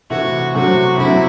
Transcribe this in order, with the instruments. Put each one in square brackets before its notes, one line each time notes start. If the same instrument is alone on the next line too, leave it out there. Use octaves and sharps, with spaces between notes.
[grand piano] C3 E3 A3 E4 [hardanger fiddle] F#4
[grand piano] C3 F#3 A3 C4 [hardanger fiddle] F#4
[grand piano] C3 F#3 A3 C4 [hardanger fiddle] E4